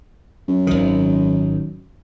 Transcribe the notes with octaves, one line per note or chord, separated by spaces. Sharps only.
F#2
G#1 D#3